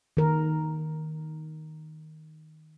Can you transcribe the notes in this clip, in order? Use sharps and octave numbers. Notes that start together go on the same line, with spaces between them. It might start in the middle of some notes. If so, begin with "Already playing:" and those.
D#3 A#4